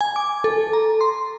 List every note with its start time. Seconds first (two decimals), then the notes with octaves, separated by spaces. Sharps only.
0.01 G#5
0.16 D6
0.44 A4
0.73 A#5
1.01 C6